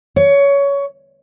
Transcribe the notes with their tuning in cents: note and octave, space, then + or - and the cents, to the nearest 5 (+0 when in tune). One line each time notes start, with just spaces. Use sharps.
C#5 +20